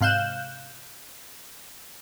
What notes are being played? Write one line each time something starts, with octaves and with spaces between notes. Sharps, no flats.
G#2 C3 F5 F#6 G6 E7